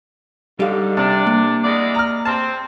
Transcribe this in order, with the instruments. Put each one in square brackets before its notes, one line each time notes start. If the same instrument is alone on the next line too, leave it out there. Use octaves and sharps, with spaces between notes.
[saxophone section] G#2 D3 [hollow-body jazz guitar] G3 F5
[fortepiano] C3 [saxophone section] D4
[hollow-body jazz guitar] A#3
[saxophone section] E2 G#3 D5
[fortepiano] A#5 F6
[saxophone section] C4 [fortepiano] A5